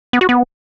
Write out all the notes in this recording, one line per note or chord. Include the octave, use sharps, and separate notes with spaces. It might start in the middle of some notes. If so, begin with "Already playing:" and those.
B3
F#4
B3